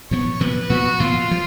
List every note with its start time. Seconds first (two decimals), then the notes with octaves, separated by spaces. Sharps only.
0.10 A#2 F3 B3 C#5
0.40 A#2 F3 B3 B4
0.70 A#2 F3 B3 F#4
1.00 A#2 F3 B3 F4
1.31 F3